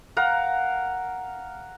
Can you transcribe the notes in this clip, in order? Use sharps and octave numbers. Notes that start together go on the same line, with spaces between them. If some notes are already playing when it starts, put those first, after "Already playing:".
A#4 F5 F#5 A#5